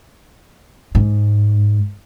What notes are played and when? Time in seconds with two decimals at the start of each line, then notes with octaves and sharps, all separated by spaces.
0.95 G#2